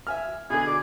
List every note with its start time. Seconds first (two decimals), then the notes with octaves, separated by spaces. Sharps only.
0.07 E5 G#5 F6
0.50 B2 D3 G#4
0.67 D5